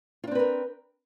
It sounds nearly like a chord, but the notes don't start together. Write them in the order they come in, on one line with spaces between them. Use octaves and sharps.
F4 D4 C4 B4 A#4